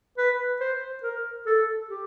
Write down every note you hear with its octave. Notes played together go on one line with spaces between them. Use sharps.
B4
C5
A#4
A4
G4